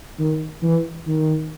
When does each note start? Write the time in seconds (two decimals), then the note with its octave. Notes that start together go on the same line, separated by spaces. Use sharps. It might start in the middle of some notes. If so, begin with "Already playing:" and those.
0.19 D#3
0.63 E3
1.07 D#3